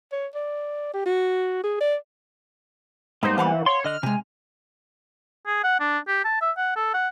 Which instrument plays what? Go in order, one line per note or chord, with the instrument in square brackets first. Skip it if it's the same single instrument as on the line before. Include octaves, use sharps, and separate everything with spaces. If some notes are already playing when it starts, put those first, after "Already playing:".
[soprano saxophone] C#5
D5
G4
F#4
G#4
D5
[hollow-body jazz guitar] G#2 C5 [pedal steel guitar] G3 A#3 B3 [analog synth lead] D#4
[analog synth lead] E3 [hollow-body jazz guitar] C5 F5 F#5
[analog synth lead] C#5 [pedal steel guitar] C6
[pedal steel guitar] D3 D#5 F#6 [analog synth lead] F6
[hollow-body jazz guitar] C3 G#3 [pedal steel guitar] G#5
[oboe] G#4
F#5
D4
G4
A5
E5
F#5
A4
F#5